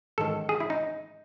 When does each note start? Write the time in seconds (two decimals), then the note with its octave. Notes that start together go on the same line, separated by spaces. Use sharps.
0.18 A1 G#2 D#3 A4
0.49 G#4
0.60 E4
0.70 D#4